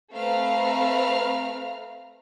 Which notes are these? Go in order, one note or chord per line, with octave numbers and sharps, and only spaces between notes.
A3 C4 B4 F5 A#5 F6